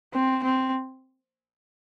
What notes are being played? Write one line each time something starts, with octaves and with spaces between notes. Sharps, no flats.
C4
C4